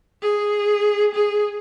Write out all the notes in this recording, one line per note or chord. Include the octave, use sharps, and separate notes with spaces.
G#4
G#4